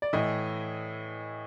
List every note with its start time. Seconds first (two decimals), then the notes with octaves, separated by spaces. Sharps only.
0.02 D5
0.13 A2 E3 D#5